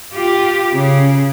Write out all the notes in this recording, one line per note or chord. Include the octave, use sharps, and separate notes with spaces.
F4 G4
C#3